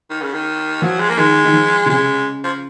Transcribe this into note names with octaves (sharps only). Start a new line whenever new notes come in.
D#3
C#3
D#3
F3 F#3
G#3
A#3
D#3 G#3
D#3
F3
C3
C#3 G#3
F3